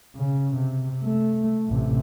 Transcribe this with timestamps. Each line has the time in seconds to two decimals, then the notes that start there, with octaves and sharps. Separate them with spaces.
0.16 C#3
0.56 C3
1.03 A3
1.68 A1 C3